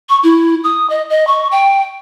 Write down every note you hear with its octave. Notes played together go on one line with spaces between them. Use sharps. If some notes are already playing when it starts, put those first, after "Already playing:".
C#6
E4
D#6
D#5
D#5
C#6
G5